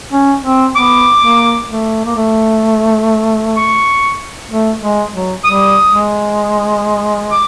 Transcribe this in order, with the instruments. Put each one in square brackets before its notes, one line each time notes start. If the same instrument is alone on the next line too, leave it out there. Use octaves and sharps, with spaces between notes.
[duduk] C#4
C4
[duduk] B3 [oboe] D6
[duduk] A#3
A3
A#3
A3
[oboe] C#6
[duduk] A3
G#3
F#3
[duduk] G3 [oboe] D#6
[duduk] G#3
[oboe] D6